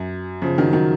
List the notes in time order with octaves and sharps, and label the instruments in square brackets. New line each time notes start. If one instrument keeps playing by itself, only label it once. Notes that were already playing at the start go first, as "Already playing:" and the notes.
Already playing: [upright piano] F#2
C#3 F3
D#3 F#3
D#3 F#3